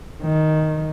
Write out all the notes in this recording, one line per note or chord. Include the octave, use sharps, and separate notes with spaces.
D#3